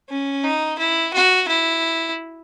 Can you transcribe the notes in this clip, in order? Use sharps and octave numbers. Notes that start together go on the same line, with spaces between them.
C#4
D#4
E4
F#4
E4